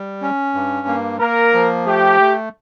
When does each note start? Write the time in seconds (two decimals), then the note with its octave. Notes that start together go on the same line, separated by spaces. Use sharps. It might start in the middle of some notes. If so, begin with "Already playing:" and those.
Already playing: G3
0.22 C#4
0.54 G2
0.88 A#3
1.20 A#3 A#4
1.53 F3
1.86 A3 G4
2.20 A3